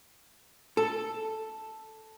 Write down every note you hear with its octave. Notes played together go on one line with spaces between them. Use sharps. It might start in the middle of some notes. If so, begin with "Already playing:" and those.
A4